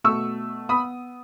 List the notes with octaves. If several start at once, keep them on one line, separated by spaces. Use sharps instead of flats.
B2 A3 C#6 E6
B3 B5 D#6